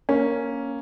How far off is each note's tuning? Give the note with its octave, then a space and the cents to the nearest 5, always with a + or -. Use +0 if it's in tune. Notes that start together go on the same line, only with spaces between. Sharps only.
A#3 +0 C#4 +0